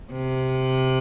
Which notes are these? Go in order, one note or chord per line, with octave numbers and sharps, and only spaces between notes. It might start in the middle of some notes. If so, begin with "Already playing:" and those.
C3